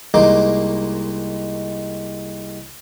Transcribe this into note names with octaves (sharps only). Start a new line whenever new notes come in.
C2 G#3 A#3 D#4 D6